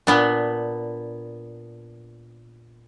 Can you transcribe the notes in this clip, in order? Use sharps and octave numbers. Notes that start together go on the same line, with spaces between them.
A#2 B3 D4